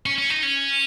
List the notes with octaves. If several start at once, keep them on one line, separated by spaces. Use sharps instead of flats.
C#4
C#4
D#4
C#4